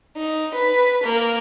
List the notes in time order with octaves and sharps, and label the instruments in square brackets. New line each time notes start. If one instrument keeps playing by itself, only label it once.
[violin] D#4
B4
A#3